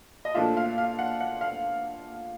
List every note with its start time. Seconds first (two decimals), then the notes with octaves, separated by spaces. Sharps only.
0.25 D#5
0.34 A#2 F3 A3 D4 F4 E5
0.57 F5
0.78 F5
0.99 F#5
1.21 F#5
1.41 F5